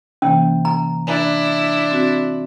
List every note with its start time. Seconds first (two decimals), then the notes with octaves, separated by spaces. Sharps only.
0.22 C3 E3 A#3 C#4
0.65 A#5
1.07 D4 E4 G#5 B5 F#6
1.91 C4 F#4